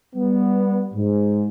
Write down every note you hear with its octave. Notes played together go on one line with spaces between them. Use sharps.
G3 B3
G#2